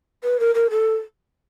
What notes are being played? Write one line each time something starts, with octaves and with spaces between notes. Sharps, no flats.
B4
A#4
A#4
A4